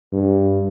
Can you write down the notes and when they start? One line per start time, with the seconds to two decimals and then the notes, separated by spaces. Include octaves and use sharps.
0.13 G2